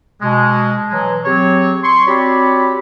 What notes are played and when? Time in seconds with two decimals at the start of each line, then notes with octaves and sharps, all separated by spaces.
0.22 B2 G#3
0.91 E3 F#3 G#3
1.24 F#3 C4 G4 G#4 C#5
1.83 C6 C#6
2.07 C4 F#4 G4 C#5 D5 B5